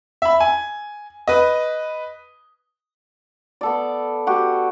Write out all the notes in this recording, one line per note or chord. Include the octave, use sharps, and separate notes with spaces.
E5 B5
G#5
B4 D#5
B3 A4 D5
F#4 G4